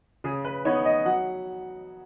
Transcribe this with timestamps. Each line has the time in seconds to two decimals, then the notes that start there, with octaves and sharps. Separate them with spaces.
0.24 C#3 G#4
0.45 B4
0.65 B3 D#4 C#5
0.85 D#5
1.05 F#3 F#5